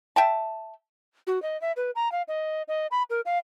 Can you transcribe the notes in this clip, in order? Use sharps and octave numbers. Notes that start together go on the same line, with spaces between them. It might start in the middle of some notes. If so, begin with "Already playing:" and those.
E5 G5 A5
F#4
D#5
E5
B4
A#5
F5
D#5
D#5
B5
A#4
F5